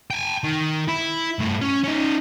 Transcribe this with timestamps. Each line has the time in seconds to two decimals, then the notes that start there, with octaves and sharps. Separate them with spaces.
0.11 G5 G#5
0.44 D#3
0.88 E4
1.39 G2 A3
1.61 C#4
1.83 C#4 D#4